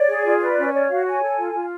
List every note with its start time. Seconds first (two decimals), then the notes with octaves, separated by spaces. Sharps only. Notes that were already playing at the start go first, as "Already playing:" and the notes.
Already playing: C#5 D5
0.09 G#4
0.25 F4
0.41 B4 D5
0.58 C#4
0.74 C#5 D5
0.89 F#4 F5
1.05 C#5 G#5
1.22 A4
1.38 F4
1.54 F4